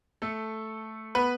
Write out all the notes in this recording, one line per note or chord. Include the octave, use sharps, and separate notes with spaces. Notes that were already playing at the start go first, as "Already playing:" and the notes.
A3 A4
B3 B4